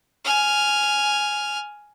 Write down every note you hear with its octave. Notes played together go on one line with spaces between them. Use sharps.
G#5 F6